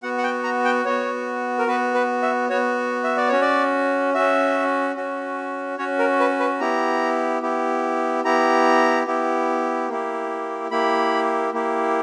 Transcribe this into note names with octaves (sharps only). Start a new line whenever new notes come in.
B3 F#4 F#5
F#5
G5
A#5
G5
B3 F#4 C#5
A#4
B3 F#4 B4
B4
E5
B3 F#4 C#5
E5
D5
C#4 F#4 C#5
D5
C#4 F#4 E5
C#4 F#4
C#4 F#4 C#5
A#4
B4
B4
B3 E4 G4 A#5
B3 E4 G4
B3 E4 G4 A#5
B3 E4 G4
A#3 E4 G4
A#3 E4 G4 B5
A#3 E4 G4